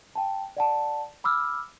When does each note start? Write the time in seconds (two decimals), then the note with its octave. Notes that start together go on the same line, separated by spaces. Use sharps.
0.15 G5 A5
0.57 D5 F#5 A5
1.24 B5 D6 E6 F6